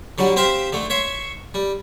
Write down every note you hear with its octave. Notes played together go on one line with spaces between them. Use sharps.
D3 F#3 G3
C4 G4 C5 E5 F5
D3 A3
C#5 E5 C6
G3